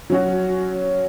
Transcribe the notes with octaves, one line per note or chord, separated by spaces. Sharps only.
F#3 C#4 F#4